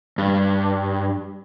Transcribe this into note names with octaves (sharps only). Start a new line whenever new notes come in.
G2